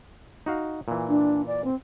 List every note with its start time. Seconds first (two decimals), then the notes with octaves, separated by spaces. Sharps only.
0.46 D#4 F#4 F5
0.88 A#2 E3
1.09 D4
1.47 D5
1.64 C4